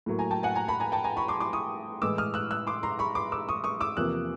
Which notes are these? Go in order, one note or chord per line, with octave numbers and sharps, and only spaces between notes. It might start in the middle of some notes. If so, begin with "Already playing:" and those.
A2 F#3 A#3
G#5 A#5
G5 A5
F#5 G#5
G#5 A#5
A5 B5
G#5 A#5
G5 A5
G#5 A#5
B5 C#6
C6 D6
C6 D6
C#6 D#6
A2 E3 G#3 D6 E6
D#6 F6
E6 F#6
E6 F#6
C6 D6
A#5 C6
B5 C#6
C6 D6
D6 E6
C#6 D#6
C#6 D#6
D6 E6
E2 C3 F3 A#3 E6 F#6